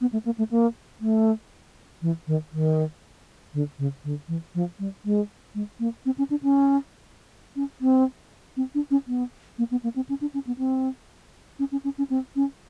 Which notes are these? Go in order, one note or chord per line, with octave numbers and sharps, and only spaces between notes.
B3
A3
A#3
A3
A#3
A3
E3
D#3
D#3
D3
C#3
D3
E3
F3
G3
G#3
G#3
A#3
C4
C#4
D4
C#4
C#4
C4
C4
D4
C#4
B3
A#3
B3
A#3
C4
C#4
D4
C#4
B3
C4
C#4
C#4
C#4
C#4
C4
C#4